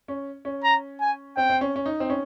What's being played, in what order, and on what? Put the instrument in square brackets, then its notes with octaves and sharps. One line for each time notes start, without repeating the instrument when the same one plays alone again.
[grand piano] C#4
C#4
[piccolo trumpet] A#5
G#5
[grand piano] C4 [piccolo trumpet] G5
[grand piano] C4
C#4
C#4
D#4
C4
C#4